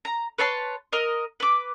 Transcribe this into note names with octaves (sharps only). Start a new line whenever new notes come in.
A#5
B4 C#5 A5 C6
A#4 D#5
B4 D6